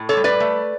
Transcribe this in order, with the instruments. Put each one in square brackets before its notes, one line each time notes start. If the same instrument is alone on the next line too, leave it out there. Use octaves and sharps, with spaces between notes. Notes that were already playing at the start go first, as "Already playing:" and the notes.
Already playing: [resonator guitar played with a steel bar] A2
A4 C#5
G3
B4 D5
A3